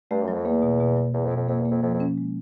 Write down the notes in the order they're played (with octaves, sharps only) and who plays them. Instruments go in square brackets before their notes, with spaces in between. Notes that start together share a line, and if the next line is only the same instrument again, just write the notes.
[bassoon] G2 [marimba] A3
[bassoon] F#2
[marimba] F#3
[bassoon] F2
[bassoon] E2 [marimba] A#3
[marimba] B2
B2
F#3
[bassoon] E2 [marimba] F#3
[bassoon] F2
[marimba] B2
[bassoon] F2
[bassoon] F2 [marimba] A#3
[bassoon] E2
[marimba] A#3
[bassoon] F2
[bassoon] F2 [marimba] F3
[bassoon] F2
[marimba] C#4
G#3